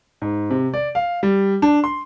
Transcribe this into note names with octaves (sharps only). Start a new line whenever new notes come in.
G#2
C3
D5
F5
G3
D4
C6